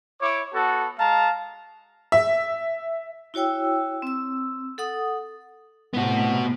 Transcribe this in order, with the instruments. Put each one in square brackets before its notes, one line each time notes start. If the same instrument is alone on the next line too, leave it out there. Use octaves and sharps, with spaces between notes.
[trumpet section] E4 C#5 D6
B3 F#4 A4
G#3 F5 A5 A#5
[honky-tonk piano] E5
[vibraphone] E4 F#4 C#5 G5 E6
C4 E6
A4 F#5 D#6
[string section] A2 C3 [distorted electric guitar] B3 F#4